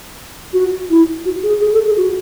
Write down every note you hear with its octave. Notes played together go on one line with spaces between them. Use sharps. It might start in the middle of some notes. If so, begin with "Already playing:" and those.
F#4
E4
F#4
G#4
G#4
A4
G#4
F#4